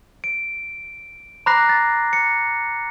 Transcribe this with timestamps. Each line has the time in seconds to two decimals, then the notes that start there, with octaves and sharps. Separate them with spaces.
0.24 D7
1.46 A#5 B5 D6 F#6 A#6 C7
1.69 A6
2.13 C#7